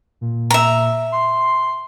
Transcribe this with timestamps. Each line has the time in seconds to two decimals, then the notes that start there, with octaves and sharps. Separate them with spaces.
0.21 A#2
0.50 E5 A#5
1.12 C6